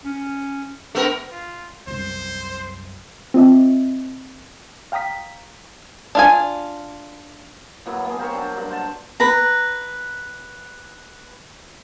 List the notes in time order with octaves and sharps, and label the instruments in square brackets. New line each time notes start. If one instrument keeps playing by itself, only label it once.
[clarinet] C#4
[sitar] A3 B3 A#4 [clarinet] D4
[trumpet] F4
[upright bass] C2 F#2 [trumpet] C5
[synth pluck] C4 F4 D#5 E5
F5 G5 A#5 D#6 B6
[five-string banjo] D4 F4 G#5
[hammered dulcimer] A2 F#3 A#3 B3
A#3 G#4
G4 A#4 C5 C#5
F#3 D4
G2 F#5
C5 F#5 A5
[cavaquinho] B4 A#5